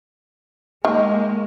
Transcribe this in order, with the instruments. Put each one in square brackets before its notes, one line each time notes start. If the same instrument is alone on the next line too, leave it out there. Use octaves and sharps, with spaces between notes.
[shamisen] D#3 [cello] G#3 A#3